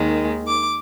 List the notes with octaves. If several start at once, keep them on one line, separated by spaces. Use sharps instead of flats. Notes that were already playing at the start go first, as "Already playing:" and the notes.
Already playing: D#2 D#3 G#3
D6